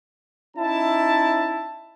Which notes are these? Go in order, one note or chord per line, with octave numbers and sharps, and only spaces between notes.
C#4 D#4 E4 A5